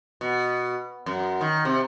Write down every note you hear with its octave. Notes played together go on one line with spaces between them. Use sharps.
B2
F#2
D#3
C3